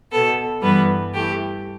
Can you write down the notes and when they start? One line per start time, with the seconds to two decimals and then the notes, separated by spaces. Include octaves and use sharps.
0.11 B2 B3 A4
0.61 G2 E3 G3 B3 B4
1.13 E3 A3 G4